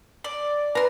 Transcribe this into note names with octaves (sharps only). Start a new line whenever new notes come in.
D5
B4 A#5 C6